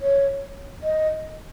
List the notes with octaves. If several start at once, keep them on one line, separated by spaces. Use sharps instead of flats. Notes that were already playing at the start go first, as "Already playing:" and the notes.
C#5
D#5